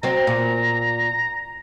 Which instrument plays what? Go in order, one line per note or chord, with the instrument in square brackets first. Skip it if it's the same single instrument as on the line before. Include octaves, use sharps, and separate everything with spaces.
[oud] F#3 C4 [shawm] A#5
[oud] A#2